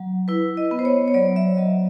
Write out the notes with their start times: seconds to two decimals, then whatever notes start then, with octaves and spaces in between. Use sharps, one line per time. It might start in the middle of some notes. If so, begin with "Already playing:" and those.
Already playing: F#3
0.28 E4 B4
0.57 D#5
0.71 B3
0.79 C5
0.85 C#5
1.08 C#5
1.14 F#3 D5
1.36 E5
1.57 F#3 D#5